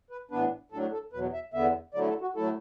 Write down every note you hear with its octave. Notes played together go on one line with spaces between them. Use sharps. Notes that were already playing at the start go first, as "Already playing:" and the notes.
B4
A2 E3 B3 D4 B4
A2 F#3 A3 D4 A4
A4
E2 B2 F#3 B4
E5
E2 D3 B3 E5
D3 F#3 A3 E4 D5
A4
F#4
A2 F#3 A3 E4 A4